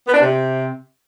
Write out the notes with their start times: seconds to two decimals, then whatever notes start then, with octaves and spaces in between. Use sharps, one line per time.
0.06 B3
0.13 D4
0.21 C3